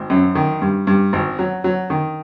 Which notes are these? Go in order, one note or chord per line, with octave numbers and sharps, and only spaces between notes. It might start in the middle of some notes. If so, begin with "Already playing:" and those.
Already playing: G#1
F#2
D#3
G2
G2
G#1
F#3
F#3
D#3